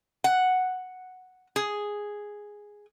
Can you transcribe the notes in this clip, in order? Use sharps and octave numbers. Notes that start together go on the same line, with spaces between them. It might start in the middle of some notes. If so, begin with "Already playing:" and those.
F#5
G#4